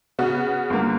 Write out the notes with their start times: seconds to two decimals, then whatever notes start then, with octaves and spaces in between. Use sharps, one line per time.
0.19 C#3 B3 F#4
0.70 G1 A#3